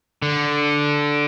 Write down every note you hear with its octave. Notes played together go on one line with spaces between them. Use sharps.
D3